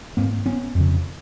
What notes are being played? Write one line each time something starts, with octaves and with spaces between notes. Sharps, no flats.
G#2 A#3 C4
B3 C#4
F2 C#3